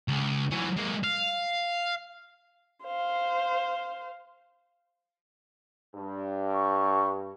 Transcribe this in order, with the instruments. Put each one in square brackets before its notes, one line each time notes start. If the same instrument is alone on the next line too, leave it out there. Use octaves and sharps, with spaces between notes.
[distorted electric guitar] C#2
E3 F#3
G#3 A#3
F5
[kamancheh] C5 F5
[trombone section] G2
[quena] C#6